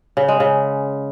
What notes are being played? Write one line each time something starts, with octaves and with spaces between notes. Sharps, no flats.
C#3
G#3
C#3